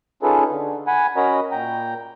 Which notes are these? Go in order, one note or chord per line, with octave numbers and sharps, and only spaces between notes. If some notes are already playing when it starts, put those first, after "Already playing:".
C#4 D#4 F4 G#4 A4 B4
D3
F#5 G#5 B5
C#4 F#4 A#4 D#5 A#5 B5
A#2 G5 A#5